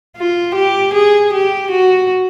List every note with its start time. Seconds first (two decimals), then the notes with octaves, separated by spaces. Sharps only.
0.17 F4
0.55 G4
0.94 G#4
1.33 G4
1.71 F#4